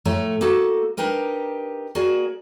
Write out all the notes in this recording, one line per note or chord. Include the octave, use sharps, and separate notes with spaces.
A2 F3 A3 C#5 A#5
A#3 D#4 F#4 A4
D4 D#4 G4 A#4 B4
A#3 F#4 G#4 D5